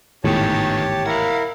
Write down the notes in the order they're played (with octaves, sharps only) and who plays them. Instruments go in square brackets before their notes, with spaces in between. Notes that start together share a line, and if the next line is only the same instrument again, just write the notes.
[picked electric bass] G#1 E2 A2 [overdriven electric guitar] D#3 E3 [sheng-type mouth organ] G4 C#5 A5
[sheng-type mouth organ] E4 A#4 [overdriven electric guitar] F5 F#5